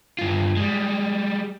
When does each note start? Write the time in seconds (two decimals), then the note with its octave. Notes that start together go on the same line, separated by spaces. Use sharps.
0.19 G2 F4
0.57 G3 G#3